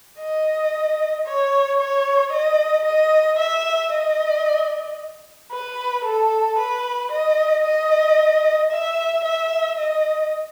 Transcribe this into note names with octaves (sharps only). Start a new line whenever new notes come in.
D#5
C#5
C#5
D#5
D#5
E5
D#5
B4
A4
B4
D#5
D#5
E5
E5
D#5